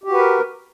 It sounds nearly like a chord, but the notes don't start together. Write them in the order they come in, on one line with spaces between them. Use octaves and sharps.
G4 F#4 B4 A#4